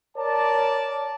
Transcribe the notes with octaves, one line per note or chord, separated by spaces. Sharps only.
A#4 C#5 D5 A5